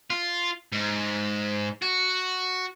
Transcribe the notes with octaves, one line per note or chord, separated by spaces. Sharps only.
F4
G#2
F#4